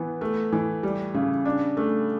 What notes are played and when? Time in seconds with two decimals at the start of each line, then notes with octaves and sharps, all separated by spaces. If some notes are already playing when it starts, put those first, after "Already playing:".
Already playing: E3 B3
0.21 A3
0.52 E3
0.83 G3
1.14 C#3
1.45 D4
1.77 A3